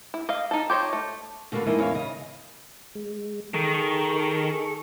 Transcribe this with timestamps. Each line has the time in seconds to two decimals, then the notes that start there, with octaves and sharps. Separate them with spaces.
0.14 E4
0.29 D#5 F5
0.51 D#4 A4
0.70 G4 C5 C#5 D#5
0.93 A3
1.52 D3 A3 A#3 F4 F#4 B4
1.66 G2 E3 A#3 D#4 E4 D#5
1.79 E2 C#4 E5 F5
1.94 C#3 D#5
2.95 G#3
3.54 D#3 G#4 A4 C#6